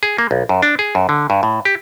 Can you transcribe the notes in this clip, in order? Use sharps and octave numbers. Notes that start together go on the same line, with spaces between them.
G#4
A#3
B1
F#2
D4
G#4
F#2
D3
G2
A2
G4